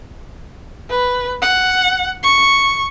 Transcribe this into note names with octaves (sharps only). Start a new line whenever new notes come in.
B4
F#5
C#6